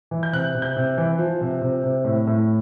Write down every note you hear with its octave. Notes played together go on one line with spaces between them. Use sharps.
E3
G6
C3 F#6
C3
G6
C3
E3
F3
C3
C3
C3
A2
A2